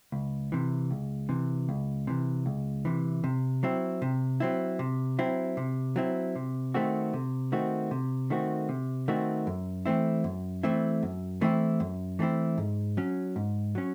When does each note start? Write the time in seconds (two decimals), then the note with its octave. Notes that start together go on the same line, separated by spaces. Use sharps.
0.12 C#2
0.52 C3 E3
0.91 C#2
1.29 C3 E3
1.69 C#2
2.07 C3 E3
2.46 C#2
2.85 C3 E3
3.24 C3
3.63 F#3 C4 E4
4.02 C3
4.40 F#3 C4 E4
4.79 C3
5.19 F#3 C4 E4
5.57 C3
5.96 F#3 C4 E4
6.36 C3
6.74 D#3 A3 C4 F#4
7.13 C3
7.52 D#3 A3 C4 F#4
7.91 C3
8.30 D#3 A3 C4 F#4
8.69 C3
9.08 D#3 A3 C4 F#4
9.47 F#2
9.86 E3 A3 C4 E4
10.24 F#2
10.63 E3 A3 C4 E4
11.03 F#2
11.41 E3 A3 C4 E4
11.80 F#2
12.19 E3 A3 C4 E4
12.58 G#2
12.97 F#3 C#4
13.36 G#2
13.75 F#3 C#4